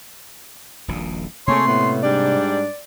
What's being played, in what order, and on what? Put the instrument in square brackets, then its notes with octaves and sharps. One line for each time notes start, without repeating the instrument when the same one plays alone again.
[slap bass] D#1 A#1 A#2
[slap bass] C3 A#3 C4 [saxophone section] A3 G#4 C#5 [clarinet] C6
[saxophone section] A2 B3
[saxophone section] G#2 G3 D4 [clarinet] D5